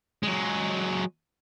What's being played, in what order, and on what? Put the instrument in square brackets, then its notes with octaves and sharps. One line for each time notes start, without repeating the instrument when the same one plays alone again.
[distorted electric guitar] F#3 G#3